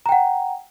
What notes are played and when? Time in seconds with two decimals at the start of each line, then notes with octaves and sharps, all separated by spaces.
0.06 A#5
0.09 G5
0.12 F#5